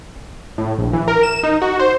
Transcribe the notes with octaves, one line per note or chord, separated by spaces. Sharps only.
A2
A#1
E3
A#4
E7
D#4
F#4
C5